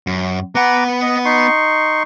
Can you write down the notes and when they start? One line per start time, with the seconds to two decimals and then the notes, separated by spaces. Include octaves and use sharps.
0.07 F#2
0.55 B3 B4 F#5 A#5 D6
1.02 D#5
1.25 D#4 C6 C#6